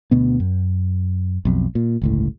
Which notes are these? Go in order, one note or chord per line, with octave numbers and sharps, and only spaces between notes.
D2 B2 B3
F#2
B1 F2
A#2
G1 C#2 A2